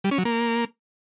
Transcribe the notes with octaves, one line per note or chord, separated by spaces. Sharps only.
G3
C#4
F#3
A#3